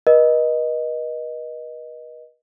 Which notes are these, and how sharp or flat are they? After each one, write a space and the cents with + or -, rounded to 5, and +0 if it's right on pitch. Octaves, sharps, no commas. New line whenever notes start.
B4 -45 D#5 +0